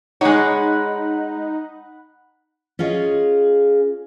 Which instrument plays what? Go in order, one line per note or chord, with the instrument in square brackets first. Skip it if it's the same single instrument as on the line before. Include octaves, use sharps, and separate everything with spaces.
[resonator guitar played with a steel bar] G#3 C#5 [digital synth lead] D#4 [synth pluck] F#5 B5 F#6
[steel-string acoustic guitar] C#4 F4 G#4 D#5